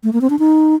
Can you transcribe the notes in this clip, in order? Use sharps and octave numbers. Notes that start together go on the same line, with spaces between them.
A3
A#3
C4
D4
D#4